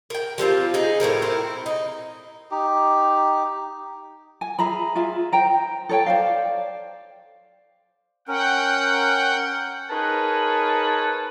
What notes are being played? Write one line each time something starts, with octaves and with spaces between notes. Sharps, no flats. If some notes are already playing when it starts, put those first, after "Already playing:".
A#4 G5
F3 G3 C4 F4
D#4 G#4
A2 C#3 F3 A#4
C4 E4
D#4
D#4 G4
G#5
G#4 E5 A#5 B5
F4 G#4 E5
C5 G5 A#5
A4 C#5 G5
C5 D5 F5
C#4 A#4 F#5 G5
D#4 G#4 A#4 B4 C#5 A5